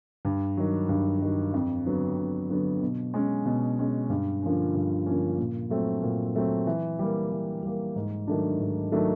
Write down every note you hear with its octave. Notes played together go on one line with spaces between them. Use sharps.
G2
D#3 F#3
G2
D#3 F#3
F2
D3 F#3 B3
F2
D3 F#3 B3
B2
G#3 C#4
B2
G#3 C#4
G2
D3 F3 A#3 C#4
G2
D3 F3 A#3 C#4
A#2
F#3 A3 C4
A#2
F#3 A3 C4
E3
G3 A#3
E3
G3 A#3
G#2
D#3 F#3 A3 D4
G#2
D#3 F#3 A3 D4